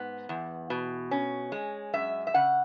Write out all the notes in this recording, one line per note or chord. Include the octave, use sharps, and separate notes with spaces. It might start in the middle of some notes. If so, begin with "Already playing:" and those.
Already playing: G#2 B3
E2
B2
C#4
G#3
F#2 E5
E5
C#3 F#5